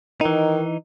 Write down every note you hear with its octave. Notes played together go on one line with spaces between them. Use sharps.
D#3 E3 D#4